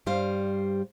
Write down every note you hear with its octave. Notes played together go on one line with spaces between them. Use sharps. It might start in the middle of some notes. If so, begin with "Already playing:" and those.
G2 G3 C5 F5